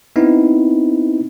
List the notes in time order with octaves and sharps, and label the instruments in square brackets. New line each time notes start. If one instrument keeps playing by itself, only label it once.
[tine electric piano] B3 C4 D#4 E4